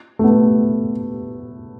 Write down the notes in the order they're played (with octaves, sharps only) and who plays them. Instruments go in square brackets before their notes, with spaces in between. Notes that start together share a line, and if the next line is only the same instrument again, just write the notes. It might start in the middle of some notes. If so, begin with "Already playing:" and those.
[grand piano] A3
B3